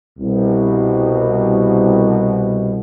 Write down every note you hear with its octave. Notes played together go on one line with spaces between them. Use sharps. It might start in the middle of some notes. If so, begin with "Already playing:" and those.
C2 B2